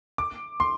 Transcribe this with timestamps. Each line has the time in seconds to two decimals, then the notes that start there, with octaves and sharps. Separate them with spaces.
0.18 D6
0.60 C6